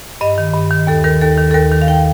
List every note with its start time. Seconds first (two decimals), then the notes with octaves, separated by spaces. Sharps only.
0.21 G2 D#5
0.38 D#3
0.54 G2
0.71 D#3
0.87 D#2 A4
1.04 D#3 A#4
1.21 D#2 A4
1.37 D#3
1.51 A4
1.54 D#2 A#4
1.72 D#3
1.82 F5
1.88 D#2 G5